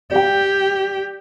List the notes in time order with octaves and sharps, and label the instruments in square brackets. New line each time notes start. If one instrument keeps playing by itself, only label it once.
[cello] G4 [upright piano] D5 G5